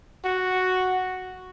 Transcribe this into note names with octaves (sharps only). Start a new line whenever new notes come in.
F#4